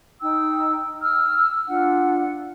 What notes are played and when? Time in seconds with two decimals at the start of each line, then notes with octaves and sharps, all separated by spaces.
0.22 D#4 G5 E6
1.02 E6 F6
1.67 D4 F4 F#5